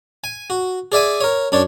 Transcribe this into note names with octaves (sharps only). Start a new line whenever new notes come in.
G#5
F#4
G#4 D5 E5 G#5
A#4 C#5
F#2 D4 C#5 A5